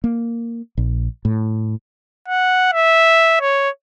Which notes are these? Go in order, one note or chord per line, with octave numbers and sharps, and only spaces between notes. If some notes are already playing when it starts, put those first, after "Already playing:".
A#3
A#1
A2
F#5
E5
C#5